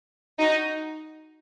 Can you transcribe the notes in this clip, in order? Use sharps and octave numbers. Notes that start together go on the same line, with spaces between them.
D#4 F#4